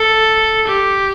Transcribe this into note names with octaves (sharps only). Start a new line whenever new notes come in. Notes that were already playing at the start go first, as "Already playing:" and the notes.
Already playing: A4
G4